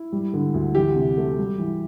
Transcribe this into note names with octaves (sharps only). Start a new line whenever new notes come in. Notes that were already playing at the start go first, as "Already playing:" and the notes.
Already playing: E4
G3
D3
D2
E3 G4
C3
A3
G3
E3